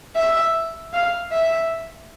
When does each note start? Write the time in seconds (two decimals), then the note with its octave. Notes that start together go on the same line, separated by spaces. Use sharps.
0.16 E5
0.93 F5
1.32 E5